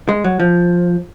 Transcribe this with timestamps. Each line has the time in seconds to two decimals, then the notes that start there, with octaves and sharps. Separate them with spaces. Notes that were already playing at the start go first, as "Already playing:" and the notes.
0.09 G#3
0.24 F#3
0.40 F3